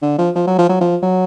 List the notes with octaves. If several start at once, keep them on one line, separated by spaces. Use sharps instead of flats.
D3
F3
F3
F#3
F3
F#3
F3
F#3